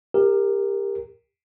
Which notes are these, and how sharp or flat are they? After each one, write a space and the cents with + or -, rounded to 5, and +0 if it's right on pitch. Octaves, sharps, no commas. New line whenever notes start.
G4 +25 A#4 -5